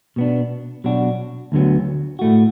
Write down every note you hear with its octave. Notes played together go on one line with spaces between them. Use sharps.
B2 B3 D4
B2 F#3 D4 F#4
D2 D3 F#3 B3
A2 A3 F#4